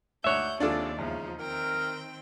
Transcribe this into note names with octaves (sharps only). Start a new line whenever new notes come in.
D2 D4 D#4 C#5 E5 F#5 F#6 G6
D#2 C3 D4 F4 G#4 A4 D5
E2 C#3 F3 D#4
D#3 C4 A#4 G5